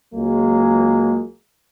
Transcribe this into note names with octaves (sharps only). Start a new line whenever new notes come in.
C#2 F#3 G#3 A#3